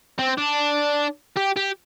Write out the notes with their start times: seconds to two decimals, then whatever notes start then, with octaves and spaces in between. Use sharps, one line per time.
0.19 C4
0.38 D4
1.36 G4
1.56 G4